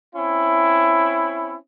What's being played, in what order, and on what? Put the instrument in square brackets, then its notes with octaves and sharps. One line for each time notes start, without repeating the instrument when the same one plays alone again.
[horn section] C4 C#4 E4